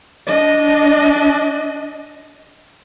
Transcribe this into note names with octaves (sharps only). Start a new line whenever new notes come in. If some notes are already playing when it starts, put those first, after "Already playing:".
D4 D#5